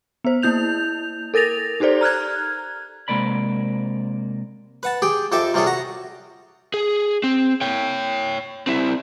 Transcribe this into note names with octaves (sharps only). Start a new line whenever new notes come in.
B3 C5
A#3 E4 G6 F7
A4 A#4 A6 A#6 F7
D#4 G4 A4 C5 D5
A#5 F6 F#6 G#6
C3 E3 G#3 A#3 D5 B5
B4 F#5 A5
G4 G#4 G5
F2 G4 A4 E5 D6
C3 G3 C#4 F4 G#4 A4
F#4 A#5
G#4
C4
C#5 G5
C4 E4